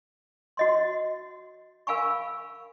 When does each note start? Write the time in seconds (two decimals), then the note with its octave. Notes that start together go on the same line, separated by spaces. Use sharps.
0.57 F#4 D#5 C6
1.87 A#4 F5 G#5 B5 C#6